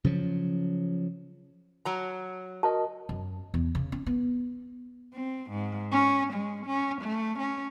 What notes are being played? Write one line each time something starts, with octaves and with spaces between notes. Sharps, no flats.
C#3 F3 F#3
F#3 A#5
F#4 A#4 D#5 A5
F#2
E2
C#3
C#4
B3
C4
G#2
C#4
G#3
C#4
A3
C#4